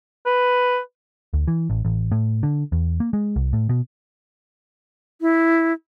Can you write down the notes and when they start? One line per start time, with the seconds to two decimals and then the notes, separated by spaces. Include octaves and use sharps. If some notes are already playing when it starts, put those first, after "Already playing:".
0.26 B4
1.33 D2
1.47 E3
1.70 A1
1.85 A1
2.12 A2
2.43 D3
2.72 E2
3.00 A#3
3.13 G#3
3.36 C2
3.53 A2
3.69 B2
5.21 E4